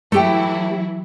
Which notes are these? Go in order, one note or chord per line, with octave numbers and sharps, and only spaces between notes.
E3 F#3 A3 E4 G4 G5